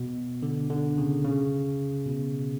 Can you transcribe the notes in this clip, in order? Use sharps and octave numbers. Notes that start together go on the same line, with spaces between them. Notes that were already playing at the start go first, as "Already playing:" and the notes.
Already playing: B2
D3
D3
C#3
C#3
B2